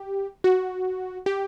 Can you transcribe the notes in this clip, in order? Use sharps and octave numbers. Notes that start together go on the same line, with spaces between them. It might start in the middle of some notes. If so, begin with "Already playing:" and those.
Already playing: G4
F#4
G4